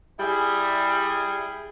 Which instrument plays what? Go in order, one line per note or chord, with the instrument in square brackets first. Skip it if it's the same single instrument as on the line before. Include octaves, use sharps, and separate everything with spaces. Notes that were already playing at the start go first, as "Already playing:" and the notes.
[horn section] G3 E4 G#4